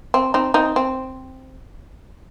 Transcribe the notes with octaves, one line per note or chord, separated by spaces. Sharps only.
C4
C4 D#4
C4 D#4
C4